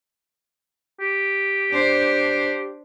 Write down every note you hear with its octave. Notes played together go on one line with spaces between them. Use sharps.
G4
D4 C5